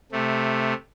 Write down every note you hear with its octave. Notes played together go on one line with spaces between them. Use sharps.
C3 A3